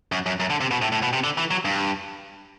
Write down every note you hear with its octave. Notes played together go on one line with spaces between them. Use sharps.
F#2
F#2
F#2
D3
C3
B2
A2
A2
B2
C3
D3
E3
F#3
G2